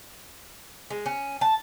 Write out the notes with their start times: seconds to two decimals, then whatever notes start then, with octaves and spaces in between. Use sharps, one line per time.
0.90 G#3
1.06 C#4
1.41 A5